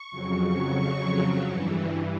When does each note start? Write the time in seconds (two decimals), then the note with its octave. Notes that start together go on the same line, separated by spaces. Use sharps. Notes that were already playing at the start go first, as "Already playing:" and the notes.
Already playing: C#6
0.11 F2 C#3 F#3
0.46 C#6
0.78 C#6
1.46 G2 E3